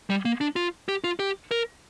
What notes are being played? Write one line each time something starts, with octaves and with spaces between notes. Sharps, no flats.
G3
A#3
D4
F4
G4
F4
G4
A#4